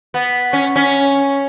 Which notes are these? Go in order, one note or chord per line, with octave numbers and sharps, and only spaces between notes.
B3
C#4
C#4